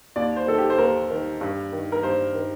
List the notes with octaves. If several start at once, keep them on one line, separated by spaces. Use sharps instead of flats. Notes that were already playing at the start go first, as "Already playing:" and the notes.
D#2 D5
C5
D#3 A4
G4
C5
D#2 A#4
D#3
G2
D#3
A#4
G2 C5
D#3